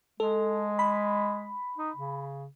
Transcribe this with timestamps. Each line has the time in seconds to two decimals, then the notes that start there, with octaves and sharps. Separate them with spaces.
0.20 G#3 A4
0.79 B5
1.78 D#4
1.96 C#3